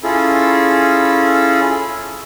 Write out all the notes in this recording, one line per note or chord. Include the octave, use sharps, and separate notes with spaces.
C#4 E4 F4 G#4 A4